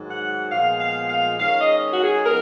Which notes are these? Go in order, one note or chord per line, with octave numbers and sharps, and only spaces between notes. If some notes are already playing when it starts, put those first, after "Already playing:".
Already playing: G#2 D#3 F#3
F#5
A#2 F3 G#3 B3 F5
F5
F5
D#3 G#3 C#4 F5
D#5
F#4
G#4
F3 B3 D#4 A#4